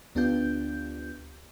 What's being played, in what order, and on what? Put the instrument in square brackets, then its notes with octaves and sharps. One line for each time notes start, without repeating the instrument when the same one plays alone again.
[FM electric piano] D2 B3 D4 F4 G4 G6